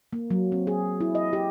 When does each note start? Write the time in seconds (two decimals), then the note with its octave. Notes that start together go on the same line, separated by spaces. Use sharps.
0.13 A#3
0.31 F#3
0.52 C4
0.67 G#4
1.01 E4
1.15 D#5
1.33 G4